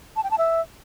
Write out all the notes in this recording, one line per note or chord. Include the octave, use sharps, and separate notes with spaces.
A5
G5
A5
E5